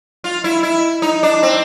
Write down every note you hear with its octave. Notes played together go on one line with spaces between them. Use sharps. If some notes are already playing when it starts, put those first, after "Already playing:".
F4
E4
E4
D#4
D4
C4